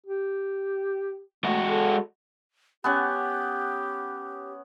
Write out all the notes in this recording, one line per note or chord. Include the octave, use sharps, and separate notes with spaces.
G4
G#3 A3 F#4
A4
B3 C#4 G4 F#5